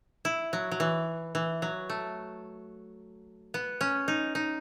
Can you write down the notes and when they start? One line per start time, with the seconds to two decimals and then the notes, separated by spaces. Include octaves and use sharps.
0.25 E4
0.53 F#3
0.71 F#3
0.80 E3
1.35 E3
1.62 F#3
1.90 A3
3.54 B3
3.81 C#4
4.08 D#4
4.35 D#4